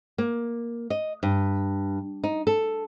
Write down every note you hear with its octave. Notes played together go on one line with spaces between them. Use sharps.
A#3
D#5
G2
D#4
A4